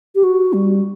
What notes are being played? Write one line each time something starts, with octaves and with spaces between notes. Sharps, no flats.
G4
F#4
G3